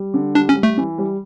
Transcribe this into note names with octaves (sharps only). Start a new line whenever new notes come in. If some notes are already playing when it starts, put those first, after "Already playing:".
Already playing: G3
D3
G3 D4
C#4
G3
A3
E3
G3